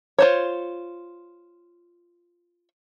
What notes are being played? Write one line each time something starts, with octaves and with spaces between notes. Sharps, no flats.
F4 C5 C#5